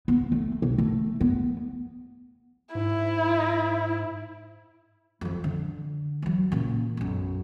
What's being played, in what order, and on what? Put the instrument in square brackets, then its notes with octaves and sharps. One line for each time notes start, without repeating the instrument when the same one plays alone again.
[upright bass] B3
A3
B1
A3
B3
[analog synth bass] G#2 [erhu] E4
[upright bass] F2 F3
D3
E3 F#3
A#2 C#3
B1 F#2